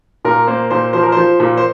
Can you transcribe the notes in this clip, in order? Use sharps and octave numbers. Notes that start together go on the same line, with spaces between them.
A#2 A#4
A#3 C5
A#2 C5
F3 C5
A#4
F3 C5
A#2
C5